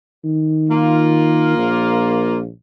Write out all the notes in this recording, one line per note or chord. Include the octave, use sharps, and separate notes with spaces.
D#3
A#3 F4
A#1